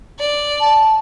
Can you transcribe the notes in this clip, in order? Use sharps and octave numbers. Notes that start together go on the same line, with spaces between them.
D5
A5